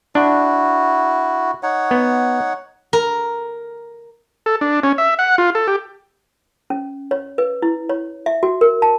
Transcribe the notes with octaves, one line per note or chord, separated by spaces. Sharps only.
D4 E4 F#4
D#4 C#5 F#5
B3
A#4
A4
D4
C#4
E5
F#5
F4
A4
G4
C#4
C#5
B4
E4
C#5
E5
F#4
A#4
A5